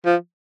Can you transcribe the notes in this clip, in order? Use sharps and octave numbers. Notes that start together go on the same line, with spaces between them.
F3